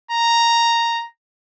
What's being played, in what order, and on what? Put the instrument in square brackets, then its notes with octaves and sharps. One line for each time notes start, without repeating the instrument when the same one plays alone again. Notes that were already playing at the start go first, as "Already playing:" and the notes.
[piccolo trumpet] A#5